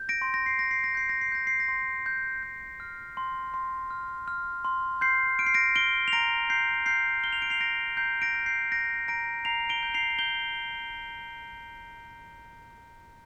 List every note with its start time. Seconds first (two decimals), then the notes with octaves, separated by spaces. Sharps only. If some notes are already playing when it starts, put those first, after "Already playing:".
Already playing: G6
0.09 A#6 D7
0.22 C6
0.34 A#6
0.46 C7
0.58 C6 A#6
0.71 C7
0.84 A#6
0.95 G6 C7
1.09 A#6
1.21 C7
1.32 G6 A#6
1.47 C7
1.60 A#6
1.68 C6
2.06 C6 G6
2.43 G6
2.80 F6
3.17 C6
3.54 C6
3.90 F6
4.28 F6
4.65 C6
5.01 C6 G6 C7
5.39 F6 D7
5.46 C7
5.54 A#6 D7
5.75 F6 D7 G7
6.08 F7
6.12 A#5 A#6 D7
6.49 A#5 G6 C7
6.86 F6 G6 C7
7.23 F6 G7
7.33 F7
7.42 D7
7.50 C7 F7
7.60 A#5 A#6 D7
7.97 A#5 G6 C7
8.22 A#6 D7
8.34 F6
8.46 G6 C7
8.72 G6 A#6 D7
9.08 A#5 A#6 D7
9.45 A#5 C7 F7
9.69 D7 G7
9.83 G6
9.94 C7 F7
10.19 G6 G7